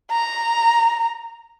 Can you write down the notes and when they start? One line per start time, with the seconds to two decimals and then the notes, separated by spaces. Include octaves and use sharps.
0.12 A#5